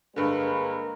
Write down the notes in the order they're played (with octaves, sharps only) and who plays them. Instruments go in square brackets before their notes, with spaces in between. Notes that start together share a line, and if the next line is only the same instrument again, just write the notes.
[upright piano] G2 D3 [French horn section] G#3 A#3 B4 [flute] A#4